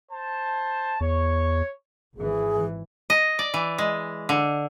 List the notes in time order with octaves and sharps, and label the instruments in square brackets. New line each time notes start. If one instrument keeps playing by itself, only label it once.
[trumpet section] C5 A5
[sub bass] E2 [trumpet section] C#5
[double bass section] G#1 E3 [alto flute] G#4
[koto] D#5
D5
E3
G#3
D3